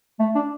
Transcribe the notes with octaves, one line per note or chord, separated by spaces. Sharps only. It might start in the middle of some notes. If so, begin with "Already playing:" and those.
A3
D4